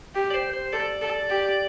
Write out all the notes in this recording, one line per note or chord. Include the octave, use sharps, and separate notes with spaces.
G4
D5
C5
C5
A4 D5
A4
G4